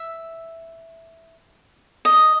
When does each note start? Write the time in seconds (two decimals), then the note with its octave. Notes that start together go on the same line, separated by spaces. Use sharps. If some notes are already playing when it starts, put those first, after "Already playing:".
Already playing: E5
2.05 D#5